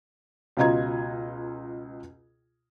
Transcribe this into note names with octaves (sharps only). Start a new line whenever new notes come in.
C#2 B2 F4 D#5 A#5 G#6